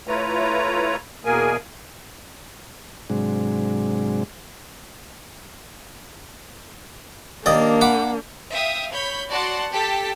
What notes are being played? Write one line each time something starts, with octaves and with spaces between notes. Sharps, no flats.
A3 E4 F4 B4 C#5 A#5
E2 B2 A#3 G#4 A#4 G#5
G#2 C3 F#3 G#3 D4
D#2 A#3 D4 D5 D#5
F#5 B5 D6
E5 F5 G5 D#6
C#5 B5 G6
F#4 D5 F#5 A5 C6
G4 A4 A5 B6